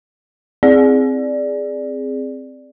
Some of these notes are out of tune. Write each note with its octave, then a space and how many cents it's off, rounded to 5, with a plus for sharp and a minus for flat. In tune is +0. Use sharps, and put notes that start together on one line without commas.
C4 +0 G#4 +0 D5 +0